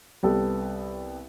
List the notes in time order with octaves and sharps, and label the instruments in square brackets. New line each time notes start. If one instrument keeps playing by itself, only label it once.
[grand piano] C2 B3 G4 A4 B4